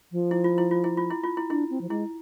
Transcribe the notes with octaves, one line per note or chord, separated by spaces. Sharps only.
F3
E4
F4
E4
F4
E4
F4
E4
F4
E4
D4 E4
C4
F3
G#3 E4